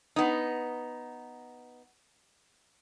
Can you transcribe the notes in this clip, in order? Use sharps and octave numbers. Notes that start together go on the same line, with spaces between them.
B3 D#4